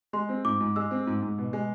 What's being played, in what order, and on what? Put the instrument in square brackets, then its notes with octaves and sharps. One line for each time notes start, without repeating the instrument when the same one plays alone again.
[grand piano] G#3 [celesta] C6
[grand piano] C4
[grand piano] G#2 [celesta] D6
[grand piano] G#2
[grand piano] G#3 [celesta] E6
[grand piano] C4
G#2
G#2
B2
G#3